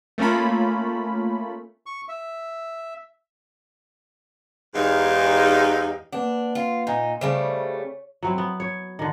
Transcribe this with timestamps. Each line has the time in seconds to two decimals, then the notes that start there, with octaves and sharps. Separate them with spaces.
0.18 A3 A#3 C#4 F4 B5
1.86 C#6
2.08 E5
4.75 E2 G#2 D#4 G4 F5
6.13 A#3 D4 B4 F#5
6.55 F4
6.87 A#2 D#4
7.21 C#3 G3 A3 C5 E5
7.74 C#5
8.23 F#3 C4 E4
8.38 B3
8.60 C#5
8.99 D3 D#3